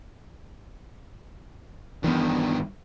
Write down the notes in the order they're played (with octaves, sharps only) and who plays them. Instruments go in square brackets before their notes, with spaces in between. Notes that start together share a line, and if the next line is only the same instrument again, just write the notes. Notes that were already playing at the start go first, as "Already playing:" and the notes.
[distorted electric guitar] G2 D#3 [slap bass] E3 B3